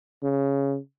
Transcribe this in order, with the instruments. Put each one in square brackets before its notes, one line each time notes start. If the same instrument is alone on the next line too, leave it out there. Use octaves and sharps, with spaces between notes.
[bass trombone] C#3